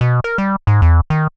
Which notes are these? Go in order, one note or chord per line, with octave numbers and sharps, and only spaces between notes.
B2
A#4
G3
G#2
E2
D#3